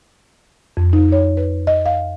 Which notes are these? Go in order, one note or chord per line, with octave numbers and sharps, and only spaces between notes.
F2
D#4
C#5
B4
D#5
F5